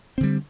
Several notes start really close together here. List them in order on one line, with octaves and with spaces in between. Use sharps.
C4 D3 G3